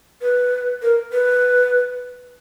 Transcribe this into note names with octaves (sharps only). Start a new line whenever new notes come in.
B4
A#4
B4